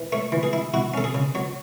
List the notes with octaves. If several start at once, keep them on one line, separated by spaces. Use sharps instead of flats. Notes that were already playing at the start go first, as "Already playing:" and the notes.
Already playing: E3
A3 C#5
E3
G#4
E4
E4 F#4
C#4 A4
G#4
C#3
F#3 C#5